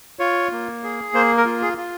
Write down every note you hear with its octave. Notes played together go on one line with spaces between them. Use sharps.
F4 C#5
A#3
G#4
A#3 C5
A#4
F4
G#4
F4